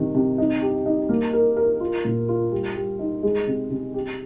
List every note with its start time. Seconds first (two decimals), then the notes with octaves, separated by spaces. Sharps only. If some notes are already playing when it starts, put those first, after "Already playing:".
Already playing: C3 D#3
0.15 C3
0.38 D#4
0.62 G4
0.86 D#4
1.09 A#3
1.33 A#4
1.57 A#4
1.80 F4
2.05 A#2
2.29 F4
2.52 G3
2.76 G3
2.99 D#4
3.23 G#3
3.47 C3
3.70 C3
3.94 G4